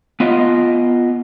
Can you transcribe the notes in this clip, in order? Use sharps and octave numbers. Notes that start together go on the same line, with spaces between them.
B3 F4 D#5